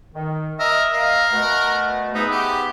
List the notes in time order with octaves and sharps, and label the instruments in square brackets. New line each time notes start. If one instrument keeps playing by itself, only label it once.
[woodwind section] D#3
[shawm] A#4 [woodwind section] D#5 [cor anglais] E5
[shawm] A#4 [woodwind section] D#5 F5
[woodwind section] B2 A3 [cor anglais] F#5
[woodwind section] G#2 E5 [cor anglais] B3 [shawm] D#4
[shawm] G4